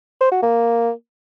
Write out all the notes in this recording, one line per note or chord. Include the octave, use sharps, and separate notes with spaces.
C5
F#4
A#3